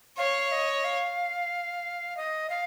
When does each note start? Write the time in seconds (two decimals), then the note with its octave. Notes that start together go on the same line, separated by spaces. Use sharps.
0.18 C#5 F5
0.52 D#5
0.84 F5
2.17 D#5
2.50 F5